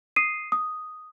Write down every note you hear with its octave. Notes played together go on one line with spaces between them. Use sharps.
D#6 C7 D#7
D#6